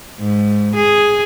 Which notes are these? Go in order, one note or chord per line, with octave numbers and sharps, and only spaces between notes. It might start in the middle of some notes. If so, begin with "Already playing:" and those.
G#2
G#4